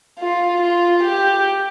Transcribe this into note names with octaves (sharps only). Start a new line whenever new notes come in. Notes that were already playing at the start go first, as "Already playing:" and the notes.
F4
F4
G4